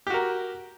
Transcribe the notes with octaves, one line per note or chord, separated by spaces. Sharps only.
F#4 G4 A#4